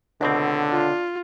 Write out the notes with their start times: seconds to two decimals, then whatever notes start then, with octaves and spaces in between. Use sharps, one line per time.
0.21 C#2 B2 D3 C4 D4
0.71 F4